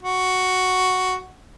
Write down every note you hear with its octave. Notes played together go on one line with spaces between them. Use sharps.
F#4